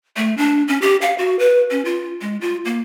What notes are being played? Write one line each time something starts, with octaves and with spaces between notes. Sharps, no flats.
A3
D4
C#4
G4
F5
F#4
B4
C#4
F4
G#3
F4
A#3